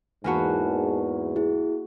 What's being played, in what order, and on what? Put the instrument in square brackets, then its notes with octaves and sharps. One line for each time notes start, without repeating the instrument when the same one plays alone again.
[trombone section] E2 G#2 [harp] A#3 B3 F#4 [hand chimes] G#5 A5
[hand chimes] E4 G#4